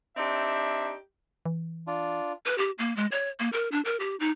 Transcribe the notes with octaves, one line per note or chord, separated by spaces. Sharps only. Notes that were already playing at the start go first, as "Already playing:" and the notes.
C4 D4 D#4 G4 E5
E3
D4 F4
B4
G4
A#3
G#3
C#5
A#3
A#4
D4
A#4
G4
D#4